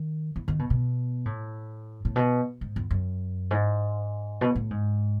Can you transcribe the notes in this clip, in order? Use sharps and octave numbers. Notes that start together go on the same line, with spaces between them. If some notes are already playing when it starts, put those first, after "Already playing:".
Already playing: D#3
E3
D#3
B2
B2
A2
A2
B2
G#2
E2
F#2
G#2
B2
A2
G#2